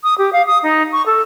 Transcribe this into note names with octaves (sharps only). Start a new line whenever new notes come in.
D#6
G4
F5
D#6
D#4
C#6
A4